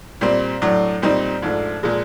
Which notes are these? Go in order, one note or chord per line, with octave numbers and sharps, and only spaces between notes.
A#2 G3 C4
A2 F#3 A3 D4
A#2 G3 C4 D#4
G#2 F3 A3 D4
A#2 F3 G#3